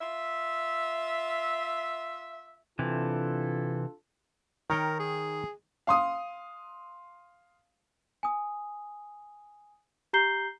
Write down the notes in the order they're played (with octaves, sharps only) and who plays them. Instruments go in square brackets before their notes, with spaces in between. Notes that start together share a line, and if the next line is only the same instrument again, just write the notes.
[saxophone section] F4 E5
[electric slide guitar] C3 E3 [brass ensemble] D4 F4 A4
[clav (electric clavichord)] D#3 C#5 G5 [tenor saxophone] A#4
[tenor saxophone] G#4
[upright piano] F5 C6 D#6
[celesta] G#5 D#6
G4 A#5 G6 C7 G7